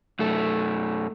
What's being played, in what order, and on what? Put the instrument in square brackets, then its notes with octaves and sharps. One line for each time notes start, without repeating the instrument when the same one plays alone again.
[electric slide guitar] F#2 A3